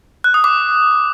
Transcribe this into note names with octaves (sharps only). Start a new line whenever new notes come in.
F#6
D#6
D6